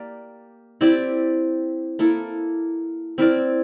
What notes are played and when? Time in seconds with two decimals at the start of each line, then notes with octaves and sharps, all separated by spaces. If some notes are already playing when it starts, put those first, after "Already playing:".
Already playing: A#3 G4 D5
0.81 C4 E4 G4 D5
1.99 A#3 E4 A4
3.18 C4 E4 A#4 D5